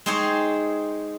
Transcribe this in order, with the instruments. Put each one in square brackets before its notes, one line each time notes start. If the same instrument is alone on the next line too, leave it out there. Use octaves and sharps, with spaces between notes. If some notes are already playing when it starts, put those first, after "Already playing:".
[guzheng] G#3 C4 D#4 G#4 C5 C#5